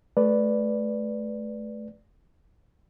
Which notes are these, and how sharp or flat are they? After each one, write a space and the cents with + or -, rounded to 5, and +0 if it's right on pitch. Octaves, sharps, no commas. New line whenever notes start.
A3 -25 B4 +0 D5 +0